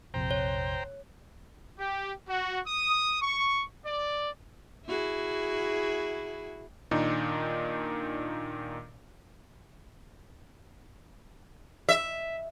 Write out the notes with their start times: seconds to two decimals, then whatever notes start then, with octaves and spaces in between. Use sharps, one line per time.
0.14 A#1 F2 C3 C5 G5 A#5
0.31 C#5
1.79 G4
2.28 F#4
2.66 D#6
3.21 C#6
3.85 D5
4.86 E4 F#4 G#4
6.91 A#2 D#3 D4 D#4
11.89 E5